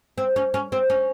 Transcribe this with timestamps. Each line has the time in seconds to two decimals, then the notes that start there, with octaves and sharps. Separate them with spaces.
0.18 C4
0.36 C#4
0.54 C#4
0.72 C4
0.90 C#4